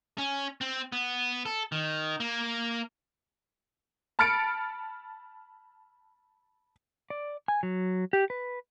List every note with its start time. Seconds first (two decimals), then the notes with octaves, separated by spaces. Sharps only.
0.18 C#4
0.61 C4
0.92 B3
1.46 A4
1.72 D#3
2.20 A#3
4.19 A5 B5 F6 A6 C#7 D7
7.10 D5
7.48 G#5
7.63 F#3
8.13 G4
8.30 B4